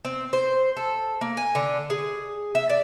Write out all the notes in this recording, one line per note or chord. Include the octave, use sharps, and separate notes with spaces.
C4
C5
A4
A#3
G#5
D3
G#4
E5
D5